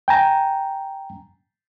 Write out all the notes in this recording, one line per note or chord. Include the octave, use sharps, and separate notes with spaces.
G5 G#5 A#5